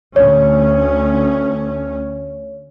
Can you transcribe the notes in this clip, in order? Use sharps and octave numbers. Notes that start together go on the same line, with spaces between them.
D2 C#4 C#5